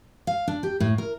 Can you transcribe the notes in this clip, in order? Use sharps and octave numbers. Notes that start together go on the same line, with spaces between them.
F5
D4
G4
A2
A#4